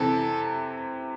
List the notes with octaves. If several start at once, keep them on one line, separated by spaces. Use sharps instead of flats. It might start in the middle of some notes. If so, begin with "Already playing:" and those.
Already playing: C3 E3 A4